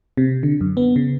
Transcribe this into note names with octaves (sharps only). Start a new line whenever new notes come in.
C3
D3
F#2
B3
C#3